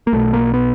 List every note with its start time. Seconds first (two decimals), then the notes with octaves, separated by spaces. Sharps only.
0.07 A#3
0.13 B1 B2 A3
0.33 A#3
0.54 B3